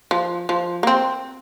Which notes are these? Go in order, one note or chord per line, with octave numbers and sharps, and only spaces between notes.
F3
F3
A#3
C4